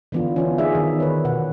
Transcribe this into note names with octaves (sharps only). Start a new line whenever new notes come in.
D3 E3 B3 D4 F4
C#4 E4 F4
B3 D#4 G#4 D5 E5
D#3
B4 C#5
B2 F#5